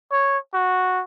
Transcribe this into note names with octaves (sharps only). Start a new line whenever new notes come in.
C#5
F#4